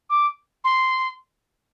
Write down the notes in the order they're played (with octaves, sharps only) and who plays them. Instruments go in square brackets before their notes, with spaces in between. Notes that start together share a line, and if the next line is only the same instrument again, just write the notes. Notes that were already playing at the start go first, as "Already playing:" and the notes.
[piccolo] D6
C6